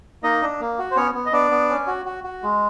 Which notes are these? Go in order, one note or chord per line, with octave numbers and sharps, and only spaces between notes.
A#3 D#4 D#5
D4
A#3
F#4
C5
B3 C#4 C#5
B3
D#5
B3 D4 D5
B3
C#4
F#4
F#4
F#4
G#3